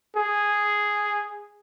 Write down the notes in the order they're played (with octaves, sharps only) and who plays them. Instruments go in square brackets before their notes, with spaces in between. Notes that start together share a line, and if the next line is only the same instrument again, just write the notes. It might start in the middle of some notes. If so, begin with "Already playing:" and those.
[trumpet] G#4